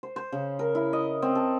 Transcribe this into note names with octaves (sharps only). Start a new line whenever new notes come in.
C5
C5
C#3
A#4
E4
D#5
C4
A4